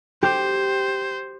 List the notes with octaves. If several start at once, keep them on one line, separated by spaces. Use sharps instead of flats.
G4 C5